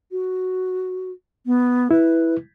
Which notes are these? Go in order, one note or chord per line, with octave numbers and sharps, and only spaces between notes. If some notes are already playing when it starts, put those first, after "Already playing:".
F#4
B3
E4 B4